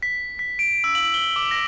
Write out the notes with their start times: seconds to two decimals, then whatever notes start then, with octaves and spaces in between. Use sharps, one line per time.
0.03 B6
0.39 B6
0.59 D7
0.84 E6
0.95 F#7
1.14 G7
1.36 D6
1.51 A#6